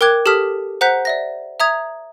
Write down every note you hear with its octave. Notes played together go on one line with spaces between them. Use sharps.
A#4 G5 D6 F#6 G#6
G4 A4 A5 D#6 F6 B6
C5 F#5 A#5 F#6 G6 B6
D5 E5 A#6
E5 A#5 D#6 G#6 F7